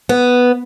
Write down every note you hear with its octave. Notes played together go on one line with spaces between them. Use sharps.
B3